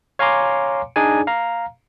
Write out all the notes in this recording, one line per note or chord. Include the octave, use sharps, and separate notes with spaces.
C#5 F5 G#5 A#5 C6 D6
D4 D#4 G#4 D5 G#5
F5 A#5